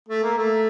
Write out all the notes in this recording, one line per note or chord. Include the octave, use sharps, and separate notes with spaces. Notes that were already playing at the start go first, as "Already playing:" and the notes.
A3
A#3
A3